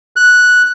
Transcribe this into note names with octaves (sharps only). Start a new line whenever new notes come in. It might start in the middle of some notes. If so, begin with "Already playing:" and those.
F#6